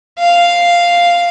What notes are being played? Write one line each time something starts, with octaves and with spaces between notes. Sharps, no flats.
F5